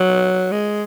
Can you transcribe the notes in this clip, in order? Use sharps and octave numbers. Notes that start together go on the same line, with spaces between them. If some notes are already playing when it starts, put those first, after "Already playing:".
Already playing: F#3
G#3